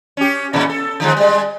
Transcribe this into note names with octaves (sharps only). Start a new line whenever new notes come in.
C#4 G4
A#2 C#3 E3
A4
D3 F3 G#3
G3 G#3